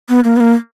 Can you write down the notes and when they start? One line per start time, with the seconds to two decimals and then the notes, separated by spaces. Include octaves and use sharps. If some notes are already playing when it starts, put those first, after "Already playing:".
0.09 B3
0.24 A#3
0.37 B3
0.40 A#3